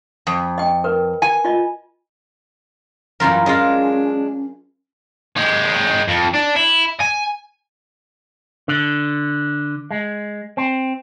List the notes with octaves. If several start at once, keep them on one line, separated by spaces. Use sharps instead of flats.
F2
D#5 G5
A#4 B4
G#5
F4 D#5
F#2 E3 G3 F4 A#4
G#3 C#4 D4 F4 D#5
G#3 G4
F2
D4
E4
G#5
D3
G#3
C4